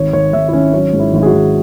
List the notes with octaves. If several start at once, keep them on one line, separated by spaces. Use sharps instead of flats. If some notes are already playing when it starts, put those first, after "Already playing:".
Already playing: G#1 C#5
G#1 C#5
G#1 E5
E4
G#1 C#4
F#3 C#4
G#2
E4
G#1
G#4
F#4
G#1